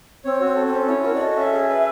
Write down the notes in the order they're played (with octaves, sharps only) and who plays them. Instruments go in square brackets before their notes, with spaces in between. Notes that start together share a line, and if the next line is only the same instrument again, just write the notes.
[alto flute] C4 [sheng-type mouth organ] C#5
[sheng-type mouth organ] F#4
[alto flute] C4
[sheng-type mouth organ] A4
[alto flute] C4
[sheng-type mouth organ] C#4
[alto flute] E4 [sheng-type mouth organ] C#5
[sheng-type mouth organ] F#4 [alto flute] A#4
[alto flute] D5
[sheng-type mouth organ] A4 [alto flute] D#5
[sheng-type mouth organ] C#4 [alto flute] E5
[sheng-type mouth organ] G#4
B4